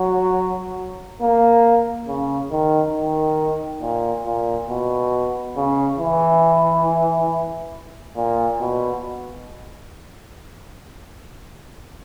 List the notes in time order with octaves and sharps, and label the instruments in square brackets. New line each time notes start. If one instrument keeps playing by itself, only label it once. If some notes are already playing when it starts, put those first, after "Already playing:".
Already playing: [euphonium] F#3
A#3
C#3
D#3
D#3
A#2
A#2
B2
C#3
E3
A#2
B2